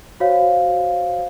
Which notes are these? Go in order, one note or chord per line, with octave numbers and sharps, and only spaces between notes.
F#4 C5 C#5 F5